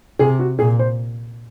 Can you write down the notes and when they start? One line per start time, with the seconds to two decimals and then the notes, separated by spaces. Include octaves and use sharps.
0.19 C3 G#4
0.39 F#4
0.59 A#2 G#4
0.79 C5